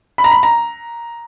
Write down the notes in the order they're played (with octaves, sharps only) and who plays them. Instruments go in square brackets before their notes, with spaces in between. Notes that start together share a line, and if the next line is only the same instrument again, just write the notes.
[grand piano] B5
A#5
B5
A#5